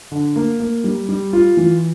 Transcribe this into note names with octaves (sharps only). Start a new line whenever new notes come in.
D3
A#3
A#3
G3
G3
F4
E3